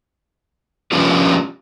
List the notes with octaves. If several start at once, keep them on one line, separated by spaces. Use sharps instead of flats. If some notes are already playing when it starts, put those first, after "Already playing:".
F3 C#4 D4 F4 G4 B4